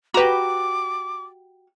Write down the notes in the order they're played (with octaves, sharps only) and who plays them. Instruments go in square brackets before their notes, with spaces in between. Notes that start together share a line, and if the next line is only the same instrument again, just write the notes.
[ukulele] F#4 G4 [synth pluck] B4 A#5 [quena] D6